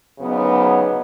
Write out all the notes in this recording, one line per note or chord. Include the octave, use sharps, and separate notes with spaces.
D2 C#3 F#3 B3 D#4